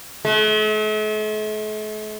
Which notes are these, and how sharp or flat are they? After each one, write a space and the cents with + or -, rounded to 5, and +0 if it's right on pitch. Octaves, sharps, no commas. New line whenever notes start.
A3 -45